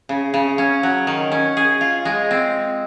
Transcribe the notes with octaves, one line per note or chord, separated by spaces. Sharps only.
C#3
C#3
C#4
F#3
D#3
C#4
G#4
F4
G#3
C4